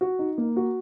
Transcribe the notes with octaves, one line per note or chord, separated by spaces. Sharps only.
F#4
D#4
A#3
F#4